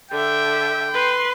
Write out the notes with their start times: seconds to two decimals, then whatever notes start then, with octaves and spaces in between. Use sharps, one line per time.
0.11 D3 E5 G5
0.92 B4 C6